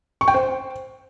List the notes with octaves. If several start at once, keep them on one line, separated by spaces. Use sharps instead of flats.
C#6
G5
C5